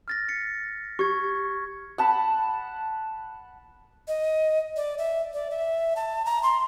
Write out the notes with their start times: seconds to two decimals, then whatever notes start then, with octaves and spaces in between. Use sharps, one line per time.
0.08 F6 A6 A#6
0.28 A6 B6 C#7
0.99 G4 C#6 G#6
1.98 F#5 A5 B5
4.08 D#5
4.76 D5
4.98 E5
5.33 D5
5.51 E5
5.96 A5
6.25 A#5
6.43 C6